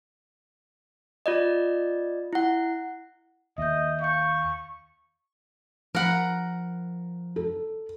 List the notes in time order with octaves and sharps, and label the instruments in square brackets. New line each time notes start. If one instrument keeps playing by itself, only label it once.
[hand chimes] F4 D5 D#5
E4 F#5
[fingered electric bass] D#2 [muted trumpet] D#5 [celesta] E5 G6
[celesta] F5 G6 [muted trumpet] C#6
[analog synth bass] F3 [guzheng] A#4 F#5 B5
[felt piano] A4